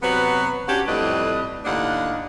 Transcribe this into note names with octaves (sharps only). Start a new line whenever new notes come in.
C3 F#3 B3 F#4 B4
C#4 D4 F#4 G4
F2 A2 G3 B4 D5 D#5
D#2 A2 D4 D#4 F5 F#5